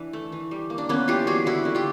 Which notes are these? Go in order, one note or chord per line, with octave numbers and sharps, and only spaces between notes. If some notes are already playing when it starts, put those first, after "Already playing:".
Already playing: E3 D4 E4
A3
E3
G3
A#3
D4
A#3 B3 C#4
E3 F4 G4
G3 F#4 G#4
D3 E4 F#4
D3
F4 G4